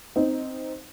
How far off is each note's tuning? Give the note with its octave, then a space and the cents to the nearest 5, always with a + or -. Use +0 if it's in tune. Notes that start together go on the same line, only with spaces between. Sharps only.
C4 +0 D#4 +0